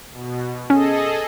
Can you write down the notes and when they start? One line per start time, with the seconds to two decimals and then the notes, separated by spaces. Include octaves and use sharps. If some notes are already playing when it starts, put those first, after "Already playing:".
0.13 B2
0.70 C#4 G#4 A4 D#5